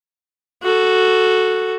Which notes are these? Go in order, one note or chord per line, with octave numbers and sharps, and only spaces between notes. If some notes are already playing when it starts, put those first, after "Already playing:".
F#4 A4